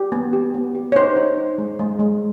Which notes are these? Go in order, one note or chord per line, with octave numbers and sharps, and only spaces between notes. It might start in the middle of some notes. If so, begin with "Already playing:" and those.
Already playing: G4
B3
G4
B3
G4
C#5
D#4 C5
D#4
D#4
G#3
G#3
G#3